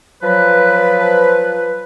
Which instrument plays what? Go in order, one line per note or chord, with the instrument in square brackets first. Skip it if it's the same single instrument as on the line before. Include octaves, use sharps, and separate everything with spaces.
[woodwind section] F3 F#3 B4